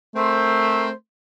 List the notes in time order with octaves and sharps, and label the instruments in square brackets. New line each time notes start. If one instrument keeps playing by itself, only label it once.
[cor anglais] A3 [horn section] C4 A#4 C5